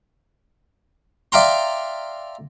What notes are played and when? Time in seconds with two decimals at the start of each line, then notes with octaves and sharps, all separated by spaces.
1.32 D5 E5 F5 G5 A#5 C6